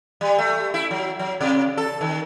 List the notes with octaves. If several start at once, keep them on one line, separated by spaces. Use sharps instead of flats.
G3
A3
E4
F#3
F#3
C3
A4
D#3